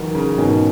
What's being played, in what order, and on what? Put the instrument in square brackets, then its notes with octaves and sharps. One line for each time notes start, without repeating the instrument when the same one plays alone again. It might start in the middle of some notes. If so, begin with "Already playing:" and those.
Already playing: [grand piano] D#3 E3 F#3
C#3
[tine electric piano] G#2 D#3 G#3 C#4 [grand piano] B2